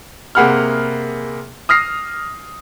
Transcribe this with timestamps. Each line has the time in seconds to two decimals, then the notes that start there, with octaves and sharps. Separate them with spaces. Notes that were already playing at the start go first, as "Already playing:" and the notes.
0.35 C3 A#3 G#4 F#5 B5 F6
1.69 D#6 F6 A#6 C7